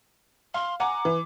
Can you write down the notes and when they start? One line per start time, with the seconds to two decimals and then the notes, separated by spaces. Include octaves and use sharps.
0.54 F5 C6
0.80 F#5 G#5 A#5 D6
1.05 E3